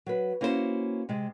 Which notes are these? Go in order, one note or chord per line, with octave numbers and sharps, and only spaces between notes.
F#3 B4
A#3 C#4 E4 F#4 G4 C5
C3 G#3